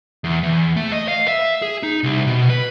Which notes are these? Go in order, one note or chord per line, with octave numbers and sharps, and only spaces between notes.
E2
E2
A3
D#5
F5
E5
G#4
D#4
C2
B2
B4